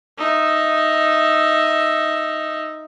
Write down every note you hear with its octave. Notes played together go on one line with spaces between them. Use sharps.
D#4 E5